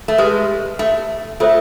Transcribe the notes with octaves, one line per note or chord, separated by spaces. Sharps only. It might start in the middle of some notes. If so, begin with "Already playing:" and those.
A3
G#3 G4 B4 E5
A3
A3 F4 A4 C5 E5